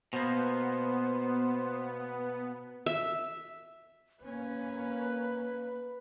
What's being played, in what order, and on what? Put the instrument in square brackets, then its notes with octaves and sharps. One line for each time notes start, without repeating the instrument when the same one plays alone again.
[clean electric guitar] B2 A#3 [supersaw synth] B3 [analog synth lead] C5
[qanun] E5
[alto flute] A#3 [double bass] C#4 [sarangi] B4